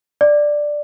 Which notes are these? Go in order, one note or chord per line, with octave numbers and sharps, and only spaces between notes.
D5